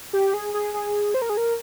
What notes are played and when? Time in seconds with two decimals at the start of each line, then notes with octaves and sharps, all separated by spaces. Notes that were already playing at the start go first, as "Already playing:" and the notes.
0.13 G4
0.34 G#4
0.54 G#4
0.74 G#4
1.14 C5
1.22 A#4
1.30 G#4
1.37 A#4